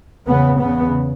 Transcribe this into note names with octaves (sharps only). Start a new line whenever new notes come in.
E2 C#3 B3
E2 C#3 B3